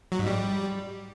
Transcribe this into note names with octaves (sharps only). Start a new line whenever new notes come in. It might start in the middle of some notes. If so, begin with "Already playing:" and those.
F#3
G#2
G3